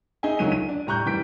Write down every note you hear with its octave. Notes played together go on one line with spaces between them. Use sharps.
D#4 G#4 D#5 E5 G#5
C#2 D3 D#3 F#3 C#4 D#7
D#7
D4
A2 G3 A#5 C#6 F#6 G6
F#2 E3 G3 G6 B6 D7